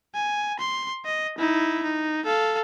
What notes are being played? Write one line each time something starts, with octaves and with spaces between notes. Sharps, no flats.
G#5
C6
D#5
D#4 E4
D#4
A4 F5